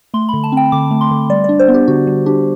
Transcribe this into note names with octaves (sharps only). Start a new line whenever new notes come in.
A3 C6
D3 B5
A5
C4 G5
D3 D6
A3
C6
D3
G3 D5
D4 D5
C5
B3
G4
D3 F#4
G3
D4 G4